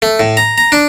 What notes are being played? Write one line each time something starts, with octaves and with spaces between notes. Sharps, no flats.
A3
A2
A#5
A#5
D4